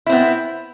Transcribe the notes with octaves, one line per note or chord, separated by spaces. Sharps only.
B3 C4 E4